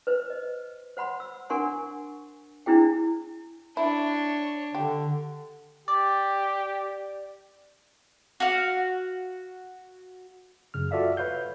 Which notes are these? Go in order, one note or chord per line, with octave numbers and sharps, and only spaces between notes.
B4 C5
D#5
C5 F#5 B5 C6
E6
D4 A#4 F#5 G#5 C6 C#6
D4 E4 G#4 G5
D4 E4 C#5
D3 G4
G4 D5
F#4 F5
F#2 C#3 F6
F4 F#4 A4 D5 E5 F5
B4 C#5 F5 G6